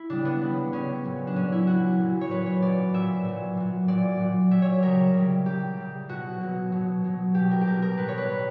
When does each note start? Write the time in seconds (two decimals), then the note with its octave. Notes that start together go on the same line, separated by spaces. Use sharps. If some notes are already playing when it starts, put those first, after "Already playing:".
Already playing: E4
0.10 C#3 G3 D4
0.25 B3
0.41 C#3 G3
0.72 C#3 G3 C#4
1.04 A#2 F#3
1.27 D4
1.35 A#2 F#3 C#4
1.52 E4
1.67 A#2 F#3 F#4
2.00 A#2 F#3
2.21 C#5
2.30 A#2 F#3 B4
2.46 C#5
2.62 A#2 F#3 D5
2.94 A#2 F#3 E5
3.25 A#2 F#3
3.57 A#2 F#3
3.88 A#2 F#3 D5
4.20 A#2 F#3
4.51 A#2 F#3 E5
4.62 C#5
4.83 C#3 G3 A#4
5.14 C#3 G3
5.46 C#3 G3 G4
5.77 C#3 G3
6.09 B2 F#3 F#4
6.41 B2 F#3
6.72 B2 F#3
7.04 B2 F#3
7.34 B2 G3 G4
7.51 A#4
7.61 G4
7.66 B2 G3 A#4
7.82 A#4
7.98 B2 G3 B4
8.08 C#5
8.18 B4
8.29 B2 G3